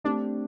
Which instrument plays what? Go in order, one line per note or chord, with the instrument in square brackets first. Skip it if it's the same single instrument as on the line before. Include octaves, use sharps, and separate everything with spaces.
[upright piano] A3 C4 G4 [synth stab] D4